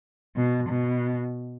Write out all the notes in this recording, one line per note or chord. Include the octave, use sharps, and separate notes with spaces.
B2
B2